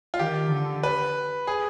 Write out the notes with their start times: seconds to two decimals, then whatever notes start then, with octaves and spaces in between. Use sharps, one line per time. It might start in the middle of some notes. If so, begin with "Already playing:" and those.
0.14 F4
0.19 D#3 G4
0.51 D3
0.83 B4
1.47 G#4